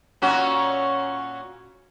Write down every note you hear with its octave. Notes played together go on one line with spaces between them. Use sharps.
A#2 C#4 F#4